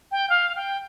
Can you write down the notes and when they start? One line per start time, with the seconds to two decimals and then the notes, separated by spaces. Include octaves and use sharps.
0.11 G5
0.30 F5
0.56 G5